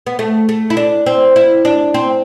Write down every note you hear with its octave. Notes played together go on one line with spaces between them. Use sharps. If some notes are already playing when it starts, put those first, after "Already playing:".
B3
A3
A3
E4
D4
C4
E4
D4
C4